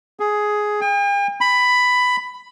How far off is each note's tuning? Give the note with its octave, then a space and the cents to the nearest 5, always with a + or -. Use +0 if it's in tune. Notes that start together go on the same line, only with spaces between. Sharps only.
G#4 +10
G5 +45
B5 +10